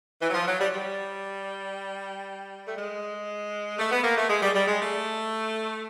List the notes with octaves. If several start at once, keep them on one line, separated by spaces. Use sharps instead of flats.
E3
F#3
F3
F#3
G3
G3
A3
G#3
A3
B3
A#3
A3
G#3
G3
G3
G#3
A3